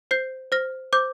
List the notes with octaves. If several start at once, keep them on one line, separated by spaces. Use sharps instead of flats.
C5 G6 C7
C5 F6 A#6
C5 D6 G6